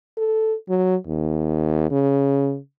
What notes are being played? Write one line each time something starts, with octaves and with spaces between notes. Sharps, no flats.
A4
F#3
D#2
C#3